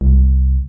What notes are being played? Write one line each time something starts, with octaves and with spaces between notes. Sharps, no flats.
C2